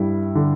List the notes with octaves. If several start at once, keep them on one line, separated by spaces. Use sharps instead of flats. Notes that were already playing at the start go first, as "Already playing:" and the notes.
Already playing: G2 E4
D3